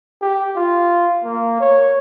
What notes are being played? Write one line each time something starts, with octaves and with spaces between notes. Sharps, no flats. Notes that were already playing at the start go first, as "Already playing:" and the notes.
G4
F4
A#3
C#5